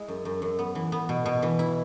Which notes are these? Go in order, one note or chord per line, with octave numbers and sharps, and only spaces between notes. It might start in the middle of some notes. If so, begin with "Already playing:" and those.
Already playing: G#3 E4
F#2
F#2
F#2
B3
E3
B3
B2
B2
E3
E4